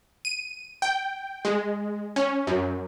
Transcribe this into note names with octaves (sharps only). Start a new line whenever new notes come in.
D#7
G5
G#3
C#4
F#2